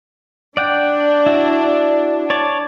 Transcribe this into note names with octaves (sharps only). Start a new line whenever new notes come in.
D4 D5 F#5 G5
E4 F#4
C#5 D5 A5